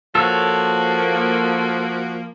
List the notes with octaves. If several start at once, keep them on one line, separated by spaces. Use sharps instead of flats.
F3 A#3 F#4 A4 C#5